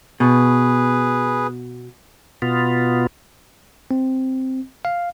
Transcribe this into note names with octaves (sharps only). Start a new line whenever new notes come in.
B2 G#4 B4
B2 B3 F4
C4
F5